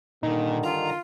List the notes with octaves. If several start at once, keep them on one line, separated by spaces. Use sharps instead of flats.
G2 A#2 D3 D#3 D#4
F4 A#5